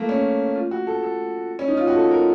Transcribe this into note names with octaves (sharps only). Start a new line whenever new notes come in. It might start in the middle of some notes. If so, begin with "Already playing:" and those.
Already playing: A3 A#3
C#4
F4
F#4
A4
A4
C#4
D#4
F4
F#4
A4
A#4